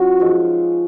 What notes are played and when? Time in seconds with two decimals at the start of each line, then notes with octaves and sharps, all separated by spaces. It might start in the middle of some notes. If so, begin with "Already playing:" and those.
Already playing: F#3 C#4 F4 F#4
0.20 F3 G#3 D#4